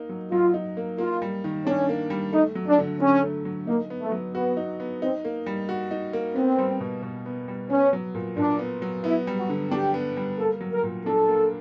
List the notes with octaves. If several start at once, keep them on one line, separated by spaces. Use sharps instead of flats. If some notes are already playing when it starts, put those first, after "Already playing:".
Already playing: A#3 D#4
F#3
F#3 F4
D#4
A#3
A#3 F4
G3
D#3
C#4 D4
A#3
G3
A3 D#4
F#3
D4
D3
D3 C#4
A3
F#3
A#3 D#4
B3
A3
F#3
B3 F#4
D#4
B3
C4 D#4
A#3
G3
F#4
D#4
A#3
B3 C4
G3
B2
B2
B3
G3
B3 C#4
F#3
A#2
A#2 D4
B3
F#3
B3 E4
G3
F#4
D3
D4 G4
B3
G3
A#3 A4
F#3
A#4
A#2
D4 A4
A#3